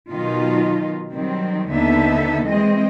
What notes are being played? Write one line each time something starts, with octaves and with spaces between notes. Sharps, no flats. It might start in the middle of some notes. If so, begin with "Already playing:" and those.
B2 D#3 F#3 D#4 F4
D#3 F#3 G3 C4
D#2 D3 B3 D#4 A4 E5
E3 G3 G#3 C4 D#5